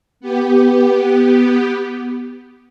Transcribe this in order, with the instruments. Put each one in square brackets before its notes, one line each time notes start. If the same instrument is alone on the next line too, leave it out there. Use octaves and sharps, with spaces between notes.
[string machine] B3 G4